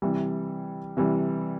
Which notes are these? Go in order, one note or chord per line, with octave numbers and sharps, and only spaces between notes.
C3 E3 G3
C3 E3 G3